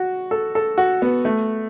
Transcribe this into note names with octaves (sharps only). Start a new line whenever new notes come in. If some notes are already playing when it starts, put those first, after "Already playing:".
Already playing: F#4
A4
A4
F#4
B3
A3